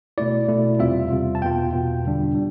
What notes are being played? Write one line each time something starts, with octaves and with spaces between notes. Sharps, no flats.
B2 A3 E4 D5
B2 A3 E4
E2 C3 G3 C4 F4 E5
E2 C3 G3 C4 F4
A5
E2 B2 B3 F4 G5
E2 B2 B3 F4
E2 D3 G3 D4
G3 D4